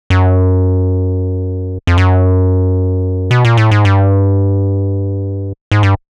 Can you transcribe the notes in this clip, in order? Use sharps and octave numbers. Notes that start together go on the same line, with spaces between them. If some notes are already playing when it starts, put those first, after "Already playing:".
F#2
F2
F#2
B2
A#2
A2
G#2
G2
G#2
G2